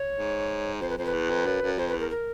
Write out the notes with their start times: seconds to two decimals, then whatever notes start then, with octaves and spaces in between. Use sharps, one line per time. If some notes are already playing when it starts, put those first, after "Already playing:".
Already playing: C#5
0.17 G#2
0.81 F2 C5
0.90 B4
0.98 F2 C5
1.06 B4
1.14 E2
1.30 F2
1.46 F#2
1.62 F#2
1.78 F2 C5
1.89 B4
1.94 E2
2.00 A#4
2.10 A#4